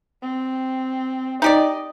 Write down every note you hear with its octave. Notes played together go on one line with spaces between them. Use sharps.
C4
D#4 G4 D5 D#5